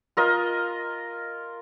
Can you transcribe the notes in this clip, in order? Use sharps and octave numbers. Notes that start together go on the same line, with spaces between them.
F4 A#4 D#5